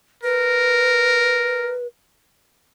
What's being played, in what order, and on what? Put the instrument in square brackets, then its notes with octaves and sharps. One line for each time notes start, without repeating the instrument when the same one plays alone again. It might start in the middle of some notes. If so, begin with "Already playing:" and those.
[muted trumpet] A#4 [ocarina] B4